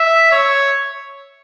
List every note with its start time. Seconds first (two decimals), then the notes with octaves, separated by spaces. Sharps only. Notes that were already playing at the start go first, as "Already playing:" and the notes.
Already playing: E5
0.32 C#5